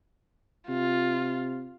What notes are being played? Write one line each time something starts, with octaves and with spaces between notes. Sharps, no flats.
C3 F4